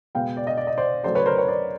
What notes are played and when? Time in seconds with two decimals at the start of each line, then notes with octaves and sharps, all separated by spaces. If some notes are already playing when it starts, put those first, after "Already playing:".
0.15 B2 G#3 B3 F5 G5
0.37 D5
0.47 D#5
0.57 D5
0.67 D#5
0.78 C5 D5
1.04 C#3 F#3 A3 C5 D5
1.15 B4 C#5
1.26 A#4 C5
1.38 B4 C#5
1.48 C5 D5